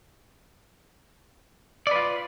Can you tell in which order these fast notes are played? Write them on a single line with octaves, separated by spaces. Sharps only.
D5 B4 F4